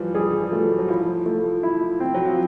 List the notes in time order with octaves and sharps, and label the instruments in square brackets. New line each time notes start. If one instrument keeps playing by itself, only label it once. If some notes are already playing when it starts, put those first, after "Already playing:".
Already playing: [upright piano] E3 F3 G3
[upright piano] G3 [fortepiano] G#4
[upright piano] E3
F3
[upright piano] F#3 [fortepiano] A3
[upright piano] F#3
[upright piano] F3 [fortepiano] E4
[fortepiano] A3
E4
C4
[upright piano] F#3
F3